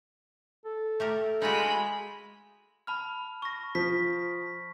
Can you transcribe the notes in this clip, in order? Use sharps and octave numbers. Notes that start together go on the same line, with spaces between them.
A4
A3 G4 A#4
G#3 D#4 F4 F#4 B5
A5 B5 F6
C#6 A#6
F3 B6